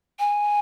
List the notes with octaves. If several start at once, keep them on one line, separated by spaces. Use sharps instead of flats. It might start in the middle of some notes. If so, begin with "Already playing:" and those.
G#5